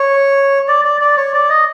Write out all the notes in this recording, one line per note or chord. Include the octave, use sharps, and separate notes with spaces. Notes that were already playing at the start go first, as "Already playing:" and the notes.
Already playing: C#5
D5
D5
D5
C#5
D5
D#5